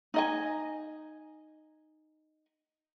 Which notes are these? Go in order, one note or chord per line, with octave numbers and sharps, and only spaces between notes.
D#4 D#5 G#5